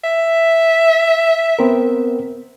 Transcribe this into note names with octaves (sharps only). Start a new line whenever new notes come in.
E5
B3 C4 A#4